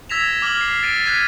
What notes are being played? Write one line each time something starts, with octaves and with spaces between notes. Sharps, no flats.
E6 G#6 A#6 B6 E7 F7
D6 F6 G#6 F#7 G7
C7
A6 D7 D#7
F6 F#6 G#6 B6 D#7